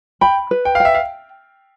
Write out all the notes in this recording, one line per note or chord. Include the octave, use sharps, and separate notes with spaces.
G5 B5
B4
G5
F5
E5 G5
F5